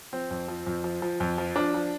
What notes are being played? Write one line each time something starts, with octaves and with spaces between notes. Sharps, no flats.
F3 C4
F2
F3
F2
F3
F3
F2
F3
F3 D4
F3